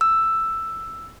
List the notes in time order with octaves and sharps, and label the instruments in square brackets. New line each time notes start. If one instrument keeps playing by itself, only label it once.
[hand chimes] E6